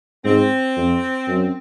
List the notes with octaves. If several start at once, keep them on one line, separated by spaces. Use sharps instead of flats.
G#2 C4
F2
F#2